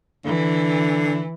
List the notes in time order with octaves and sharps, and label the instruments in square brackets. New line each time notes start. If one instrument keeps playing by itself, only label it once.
[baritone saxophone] D3 [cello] E3